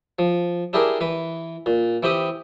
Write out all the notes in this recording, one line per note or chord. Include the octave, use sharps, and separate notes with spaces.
F3
D4 E4 G4 G#4 A#4
E3 B4
A#2
E3 C4 G4 B5 D#6